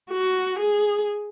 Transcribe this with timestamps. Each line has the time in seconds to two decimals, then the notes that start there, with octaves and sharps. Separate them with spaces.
0.11 F#4
0.60 G#4